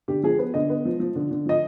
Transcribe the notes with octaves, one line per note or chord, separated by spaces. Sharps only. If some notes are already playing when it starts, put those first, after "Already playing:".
D3 G4
F3 G#4
B3 B4
D3 D#5
B3
F3
F3
D3
D3
F3 D#5